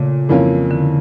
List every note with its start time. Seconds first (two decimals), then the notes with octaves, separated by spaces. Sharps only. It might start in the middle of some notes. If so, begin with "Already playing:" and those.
Already playing: A#2 C#3 A3
0.29 F2 E3 A#3 C#4 F4
0.71 D3